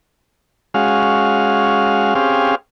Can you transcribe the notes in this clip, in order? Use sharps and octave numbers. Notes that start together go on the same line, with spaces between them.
G#3 C#4 F#4 F5
C4 C#4 G4 G#4 F5